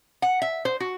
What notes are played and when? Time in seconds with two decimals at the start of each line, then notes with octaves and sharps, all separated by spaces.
0.22 F#5
0.42 E5
0.65 C5
0.80 F#4